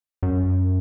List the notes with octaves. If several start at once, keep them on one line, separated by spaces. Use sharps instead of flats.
F#2